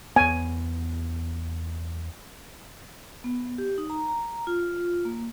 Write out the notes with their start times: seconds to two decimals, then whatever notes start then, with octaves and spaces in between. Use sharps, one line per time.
0.16 E2 B3 G#5
3.24 B3
3.58 G4
3.78 D#4
3.90 A#5
4.08 A#5
4.47 F4
5.05 A#3